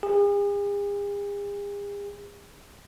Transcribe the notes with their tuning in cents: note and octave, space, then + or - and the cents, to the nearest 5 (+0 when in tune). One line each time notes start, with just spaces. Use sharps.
G#4 -45